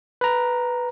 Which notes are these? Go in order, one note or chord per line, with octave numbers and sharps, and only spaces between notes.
B4 A#5